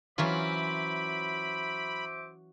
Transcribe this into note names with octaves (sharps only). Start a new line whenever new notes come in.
E3 F#3 C#4 F4 C5 E5 B5 D6